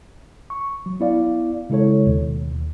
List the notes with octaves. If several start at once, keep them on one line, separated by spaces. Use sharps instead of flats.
C#6
F#3
B3 E4 D5 F5
C#3 G#3 E4 A4 C#5
D#2 B2 D#3